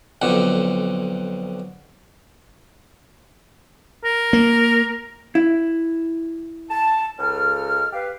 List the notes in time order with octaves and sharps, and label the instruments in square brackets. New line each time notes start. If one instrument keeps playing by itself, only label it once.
[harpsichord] B1 F2 D3
[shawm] A#4
[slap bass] A#3
[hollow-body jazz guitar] E4
[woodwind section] A5
C#2 A4 F6
G4 B4 F5